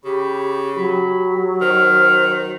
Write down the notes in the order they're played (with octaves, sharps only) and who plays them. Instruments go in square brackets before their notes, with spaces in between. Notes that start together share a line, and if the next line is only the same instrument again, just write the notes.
[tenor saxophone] C#3 [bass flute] G4 [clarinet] B5
[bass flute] F#3 [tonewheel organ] G4 [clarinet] B5
[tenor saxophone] D#3 [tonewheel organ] C5 [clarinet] F6